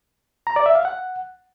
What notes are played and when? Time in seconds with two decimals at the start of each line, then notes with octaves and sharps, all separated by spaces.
0.47 A#5
0.56 D5
0.66 E5
0.75 F5
0.85 F#5